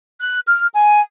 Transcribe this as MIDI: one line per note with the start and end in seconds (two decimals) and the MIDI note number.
0.20 0.39 90
0.48 0.66 89
0.74 1.01 80